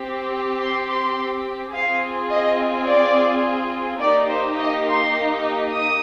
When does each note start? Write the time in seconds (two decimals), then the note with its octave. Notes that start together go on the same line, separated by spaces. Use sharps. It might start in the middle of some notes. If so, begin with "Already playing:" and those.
Already playing: C4 G4
0.60 C6
0.88 C6
1.74 C4 F4 G#4 F5
2.31 D#5
2.88 D5
4.01 A#3 D#4 G4 D5
4.29 C5
4.58 D#5
4.86 C6
5.71 D#6